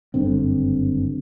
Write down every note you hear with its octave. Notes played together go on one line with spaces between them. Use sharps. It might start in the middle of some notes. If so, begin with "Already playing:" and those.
F#1 G2 D3 C4